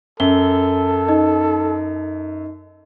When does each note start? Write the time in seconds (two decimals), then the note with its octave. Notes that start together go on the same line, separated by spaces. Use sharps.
0.20 F#2 A4 G7
1.08 D#4 D#5